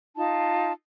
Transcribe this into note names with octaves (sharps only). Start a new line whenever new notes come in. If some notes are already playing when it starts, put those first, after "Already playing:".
D#4 F4 A5